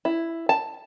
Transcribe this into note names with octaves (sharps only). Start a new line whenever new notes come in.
E4
A5